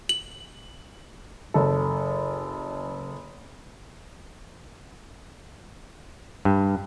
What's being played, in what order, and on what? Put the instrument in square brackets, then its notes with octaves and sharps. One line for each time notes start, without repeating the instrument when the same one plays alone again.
[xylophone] F#7
[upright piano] F#1 A4
[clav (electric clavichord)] G2